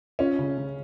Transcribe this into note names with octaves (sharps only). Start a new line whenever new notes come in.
C#4 F4
C#3
C#3